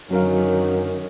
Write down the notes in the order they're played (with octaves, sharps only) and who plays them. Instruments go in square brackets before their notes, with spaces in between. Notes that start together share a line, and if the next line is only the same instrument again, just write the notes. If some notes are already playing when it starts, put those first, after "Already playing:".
[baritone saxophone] F#2 [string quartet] D3 D#3 C#4 [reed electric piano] F#3 A#4 F5